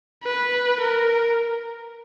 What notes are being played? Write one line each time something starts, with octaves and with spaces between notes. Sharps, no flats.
B4
A#4